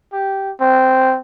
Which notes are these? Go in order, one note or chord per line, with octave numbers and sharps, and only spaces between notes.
G4
C4